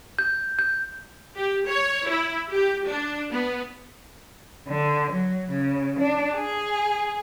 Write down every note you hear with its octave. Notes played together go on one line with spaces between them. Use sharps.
G6
G6
G4
C#5
E4
G4
D4
B3
D3
F#3
C#3
D4
G#4